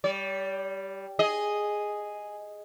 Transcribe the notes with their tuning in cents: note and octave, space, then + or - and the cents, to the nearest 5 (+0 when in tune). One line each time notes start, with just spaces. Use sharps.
G3 +0 D5 -45
G#4 +0 D#5 +0